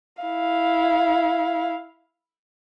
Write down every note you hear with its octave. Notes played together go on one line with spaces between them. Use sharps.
E4 F5